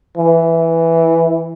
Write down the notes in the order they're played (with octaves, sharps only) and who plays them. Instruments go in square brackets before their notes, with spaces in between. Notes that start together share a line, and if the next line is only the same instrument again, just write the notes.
[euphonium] E3